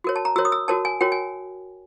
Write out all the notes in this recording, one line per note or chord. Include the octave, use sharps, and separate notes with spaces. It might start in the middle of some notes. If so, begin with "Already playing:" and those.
F#4 A#4 C#5
A5
A#5
F#4 A#4 C#5 E6
D#6
E6
F#4 A#4 C#5 A5
G#5
F#4 A#4 C#5 G5
G#5